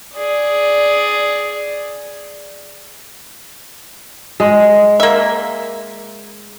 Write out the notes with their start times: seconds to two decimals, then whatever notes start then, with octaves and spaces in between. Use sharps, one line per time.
0.15 G#4 D5
4.40 G#3
5.00 A#3 E5